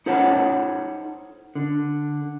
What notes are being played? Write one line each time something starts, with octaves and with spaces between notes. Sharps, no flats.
D#4 A4 C5 C#5 F#5
D3